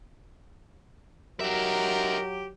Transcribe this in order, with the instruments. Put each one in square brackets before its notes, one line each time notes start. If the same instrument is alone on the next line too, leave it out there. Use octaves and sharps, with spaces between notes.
[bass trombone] F#3 [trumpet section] D#4 A#4 [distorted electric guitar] F#4 E5 [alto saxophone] G4